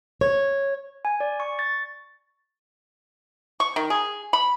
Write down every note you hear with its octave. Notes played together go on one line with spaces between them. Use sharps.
C#5
G#5
D5
C#6
A6
C#6
D#3
G#4
B5